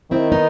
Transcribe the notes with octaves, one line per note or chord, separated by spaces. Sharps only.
D#3 C4 E4
B3 D#4